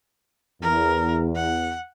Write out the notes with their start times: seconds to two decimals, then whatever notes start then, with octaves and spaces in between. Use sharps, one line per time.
0.62 E2 A#4
1.36 F#5